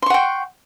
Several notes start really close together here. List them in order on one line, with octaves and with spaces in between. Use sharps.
C6 C#6 F#5 G5